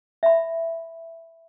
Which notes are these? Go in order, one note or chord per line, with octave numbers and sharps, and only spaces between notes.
E5 B5